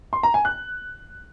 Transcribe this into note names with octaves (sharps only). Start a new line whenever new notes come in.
C6
A#5
G#5
F#6